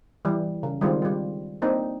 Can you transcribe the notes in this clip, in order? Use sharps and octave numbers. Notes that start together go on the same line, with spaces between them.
E3 G3
C#3
D#3 G3 G#3 C4 F4
G3 F4
A#3 C4 D4 D#4